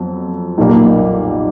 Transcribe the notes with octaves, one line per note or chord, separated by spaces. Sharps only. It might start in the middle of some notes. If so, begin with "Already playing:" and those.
Already playing: F2 F#3 B3
B1 A#2 G3 A#3